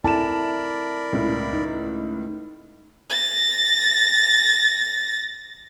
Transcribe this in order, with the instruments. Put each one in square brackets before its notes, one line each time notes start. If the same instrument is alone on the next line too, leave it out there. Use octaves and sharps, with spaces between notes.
[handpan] C4 E4 A4 [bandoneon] A#4 D5 B5 [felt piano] A5 E7
[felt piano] C#2 A2
[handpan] D#4
[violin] A6 A#6